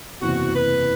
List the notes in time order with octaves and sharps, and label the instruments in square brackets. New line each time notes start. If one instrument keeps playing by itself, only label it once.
[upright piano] F#1 E2 C3 [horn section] F#4
[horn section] B4